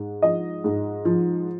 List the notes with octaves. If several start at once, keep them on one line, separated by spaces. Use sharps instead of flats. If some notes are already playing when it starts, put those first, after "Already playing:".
Already playing: G#2
F3 D#5
G#2
F3